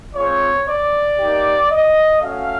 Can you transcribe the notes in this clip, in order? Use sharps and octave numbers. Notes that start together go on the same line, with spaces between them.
G#3 C4 F4 C#5
D5
A#3 D#4 G4
D#5
A3 C#4 F#4 F5